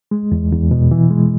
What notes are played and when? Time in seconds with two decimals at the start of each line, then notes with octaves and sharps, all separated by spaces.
0.11 G#3
0.32 E2
0.52 E2
0.71 B2
0.91 E3
1.11 G#3